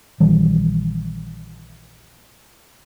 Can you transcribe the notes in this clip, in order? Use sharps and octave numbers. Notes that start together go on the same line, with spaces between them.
A#1 D#3 E3 G3